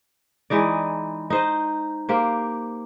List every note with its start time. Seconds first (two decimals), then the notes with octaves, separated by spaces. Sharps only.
0.50 E3 G#3 D#4 D5
1.30 D#4 C5 D#5
2.09 A#3 G4 C5